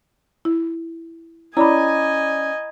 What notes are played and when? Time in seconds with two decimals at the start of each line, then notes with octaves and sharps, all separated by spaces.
0.45 E4
1.57 C#4 E4 D5 D#5 G#5 A#5 B5